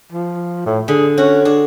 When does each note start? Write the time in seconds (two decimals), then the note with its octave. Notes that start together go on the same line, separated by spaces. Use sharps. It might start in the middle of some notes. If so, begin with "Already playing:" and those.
0.12 F3
0.66 A2
0.88 D3 G#4
1.18 C#4 F#4
1.45 D4 G#4